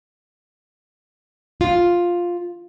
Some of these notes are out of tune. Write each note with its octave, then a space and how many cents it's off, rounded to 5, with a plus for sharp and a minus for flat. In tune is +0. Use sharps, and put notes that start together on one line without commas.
F4 +5